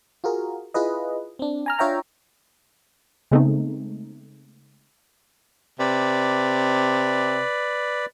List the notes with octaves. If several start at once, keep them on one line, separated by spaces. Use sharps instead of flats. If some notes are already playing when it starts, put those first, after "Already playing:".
F4 F#4 G#4 A#4
E4 F4 G#4 B4 D#5
C4 D4
G#5 A#5 F6
D4 F4 C#5 E5 G5 A#5
C#3 G#3 A3 B3 C4 D#4
C3 B4 D5